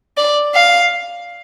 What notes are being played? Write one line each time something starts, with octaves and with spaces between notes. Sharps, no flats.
D5
F5